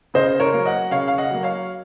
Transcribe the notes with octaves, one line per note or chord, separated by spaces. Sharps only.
C#3 C5 D#5
A#4 C#5
F#3 A#3
D#5 F#5
C#3 C#5 F5
F5
D#5 F#5
F#3 A#3
C#5 F5